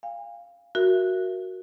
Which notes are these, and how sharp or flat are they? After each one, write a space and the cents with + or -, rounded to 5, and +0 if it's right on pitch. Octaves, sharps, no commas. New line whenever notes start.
F5 +0 G#5 -45
F#4 +0 A#4 +0 E5 +20